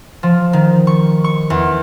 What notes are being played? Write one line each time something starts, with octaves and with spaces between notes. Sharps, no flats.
F3
D#3
C#6
C#6
E2